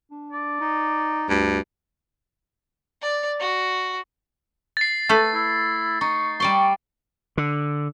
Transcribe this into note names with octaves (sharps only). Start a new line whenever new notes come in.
D4
D5
D#4
D2 G2
D5
F#4
A6 C7
A3 A4 B4
E4
D#4 C#6
G3 D5 C6 C#6
D3